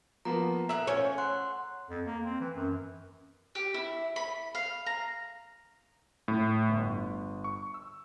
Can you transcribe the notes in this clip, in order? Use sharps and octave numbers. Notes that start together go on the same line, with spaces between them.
F3 A#3 B3 A#5
A4 E5 F#5 A#5 E6
F3 C#4 C#5
F#5 C6 F#6
F2
A#3
C4
E3
F#2
G4
E4
B5
F5
A#5
A2
G1
C#6
E6